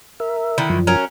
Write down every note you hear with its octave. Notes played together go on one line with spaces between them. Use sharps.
A#4 E5
D3 D#3 E4
F#2 F3
F#3 C#4 A#4